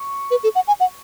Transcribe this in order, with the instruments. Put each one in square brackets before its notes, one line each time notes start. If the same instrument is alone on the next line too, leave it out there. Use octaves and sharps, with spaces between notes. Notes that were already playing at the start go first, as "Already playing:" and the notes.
Already playing: [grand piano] C#6
[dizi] B4
A4
F#5
G#5
F#5